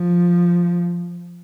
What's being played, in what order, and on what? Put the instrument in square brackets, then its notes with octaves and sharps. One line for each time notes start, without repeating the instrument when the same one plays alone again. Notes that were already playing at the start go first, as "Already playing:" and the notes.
Already playing: [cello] F3